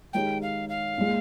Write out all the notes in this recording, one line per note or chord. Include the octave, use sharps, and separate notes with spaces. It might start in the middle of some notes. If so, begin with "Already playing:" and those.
D#3 G#3 D#4 G4 C#5 G5
F5
F5
A#2 G#3